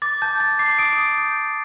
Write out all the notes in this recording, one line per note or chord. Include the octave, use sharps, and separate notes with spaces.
D6 A6
A5 G6
A5 A6
D6 C7
D#6 D7
D#6
G6
G6